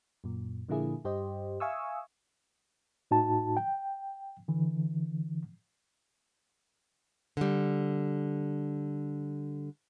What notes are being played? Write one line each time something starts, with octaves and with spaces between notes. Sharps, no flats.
F#2 A#2
A#2 D3 F3 A#3 E4 G#4
G2 G4 C5 D#5
E5 F5 G#5 C#6 D#6 E6
A2 D#4 F#4 A5
G5
D3 E3
D3 G3